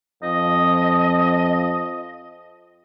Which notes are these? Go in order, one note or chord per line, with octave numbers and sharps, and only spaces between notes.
F2 D#5